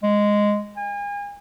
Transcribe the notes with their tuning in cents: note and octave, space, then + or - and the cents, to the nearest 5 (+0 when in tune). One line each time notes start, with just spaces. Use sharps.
G#3 -5
G#5 -35